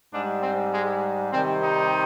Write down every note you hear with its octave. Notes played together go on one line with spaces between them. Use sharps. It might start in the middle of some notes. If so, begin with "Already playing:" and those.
G#2 G3 D4
C4
G#3
C3 D#3 G3 C4
D#4